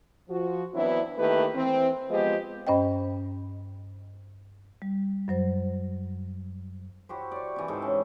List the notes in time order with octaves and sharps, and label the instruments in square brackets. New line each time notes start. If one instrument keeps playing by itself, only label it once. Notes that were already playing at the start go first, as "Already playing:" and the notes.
[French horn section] F3 F#4
E3 F#3 B3 C4 D4 E4
D#3 A3 A#3 E4 G4 B4
E3 C4
F3 G#3 B3 C4 G4 D#5
[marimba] G2 C#4 C5 D#5 G5
G3
F#2 F#3 C5
[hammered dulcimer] E4 F#4 G4 C5
D5 C#6
C3 E3
G#2 A4
C#4